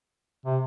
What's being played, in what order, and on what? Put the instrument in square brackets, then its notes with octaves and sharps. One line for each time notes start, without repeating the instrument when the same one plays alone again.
[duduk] C3